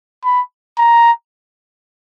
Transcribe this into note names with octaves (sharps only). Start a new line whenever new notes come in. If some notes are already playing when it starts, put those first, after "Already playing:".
B5
A#5